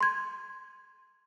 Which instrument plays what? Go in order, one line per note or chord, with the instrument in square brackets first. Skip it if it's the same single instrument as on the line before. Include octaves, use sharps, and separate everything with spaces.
[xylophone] C6 G#6